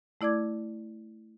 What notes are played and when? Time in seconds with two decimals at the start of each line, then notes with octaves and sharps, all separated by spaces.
0.21 A3 E4 D5 D6 G#6